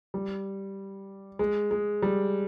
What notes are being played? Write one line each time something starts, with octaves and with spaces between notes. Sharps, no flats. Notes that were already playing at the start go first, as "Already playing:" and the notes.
G3
G#3
G#3
G3